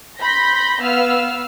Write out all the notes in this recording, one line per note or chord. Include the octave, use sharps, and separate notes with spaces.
B5 C6 G6 A#6 B6
B3 B4 F5 E6 F6